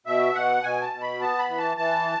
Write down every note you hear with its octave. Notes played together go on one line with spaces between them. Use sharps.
B2 E5
B2 F#5
B2 G#5
A5
B2
B5
B3 A5
B5
E3
A5
E3 A5